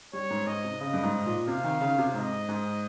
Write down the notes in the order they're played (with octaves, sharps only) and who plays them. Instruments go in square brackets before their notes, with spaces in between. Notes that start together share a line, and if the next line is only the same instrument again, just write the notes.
[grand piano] G3 [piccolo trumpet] C#5
[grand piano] G#2
[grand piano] G#2 [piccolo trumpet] D#5
[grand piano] C3
[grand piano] C#3 [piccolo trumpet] D#5
[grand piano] G2
G#2
A#2
[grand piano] C3 [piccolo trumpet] F5
[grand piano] D#3
C#3
C3
[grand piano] G#2 [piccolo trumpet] D#5
[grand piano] G#2